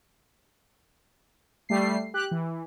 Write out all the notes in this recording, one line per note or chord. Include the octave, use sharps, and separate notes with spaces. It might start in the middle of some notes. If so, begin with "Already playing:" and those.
G3 A3 C7
G4 F#6
E3